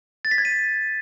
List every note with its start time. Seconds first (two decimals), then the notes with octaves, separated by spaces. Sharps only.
0.25 A6
0.31 B6
0.38 G#6
0.45 D#7